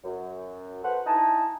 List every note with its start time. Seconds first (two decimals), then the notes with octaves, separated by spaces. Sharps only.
0.04 F#2
0.84 A4 B4 C5 F#5
1.07 D#4 E4 G#5 A5